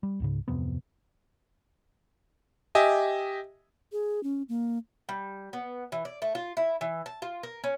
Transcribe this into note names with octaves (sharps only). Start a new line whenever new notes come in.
G3
C#2 G#2 C#3
D1 F2 C3 B3
G4 D#5 E5 G#5
G#4
C#4
A#3
G3
B3
E3
D5
A3
F4
E4
E3
A5
F4
A#4
C#4